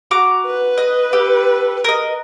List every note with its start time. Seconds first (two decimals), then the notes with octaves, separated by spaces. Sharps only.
0.11 F#4 A#5 D6
0.46 B4
0.78 D#5
1.13 G4 A4
1.84 A#4 D#5